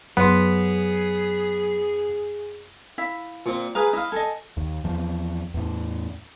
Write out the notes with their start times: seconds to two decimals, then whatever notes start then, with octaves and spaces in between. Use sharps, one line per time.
0.17 F#2 F#3 B3 G#4 C6
2.98 E4 E5 F5
3.46 A#2 C4
3.75 G#4 B4 F5 A#5
3.93 E4 D#5 F5
4.12 A4 D#5 G#5 A5
4.57 D#2
4.84 E2 F3
5.54 E2 A2